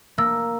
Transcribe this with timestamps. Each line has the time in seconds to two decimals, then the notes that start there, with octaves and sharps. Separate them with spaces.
0.18 A#3 E6